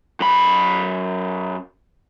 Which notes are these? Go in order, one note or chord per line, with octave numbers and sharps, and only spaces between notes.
F#2 B5